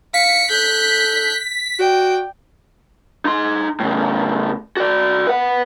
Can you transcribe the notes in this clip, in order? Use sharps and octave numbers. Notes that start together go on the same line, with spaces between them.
F5 B6 C#7
A4 F#6 G6
F#4 D5 G5
D#4 C6
A2 C#3
F#4 D5
B4 F#5